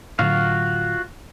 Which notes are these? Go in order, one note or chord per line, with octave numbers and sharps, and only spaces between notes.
A2 D3 F#3 F4 F#4 F5